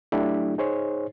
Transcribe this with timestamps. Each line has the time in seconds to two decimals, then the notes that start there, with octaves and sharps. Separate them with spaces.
0.12 F#3 A3 D4 E4 G4
0.58 D#4 G#4 C5 C#5